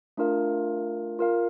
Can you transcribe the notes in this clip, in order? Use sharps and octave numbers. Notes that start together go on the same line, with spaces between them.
A3 D4 F4 A#4 F5
F4 A#4 F5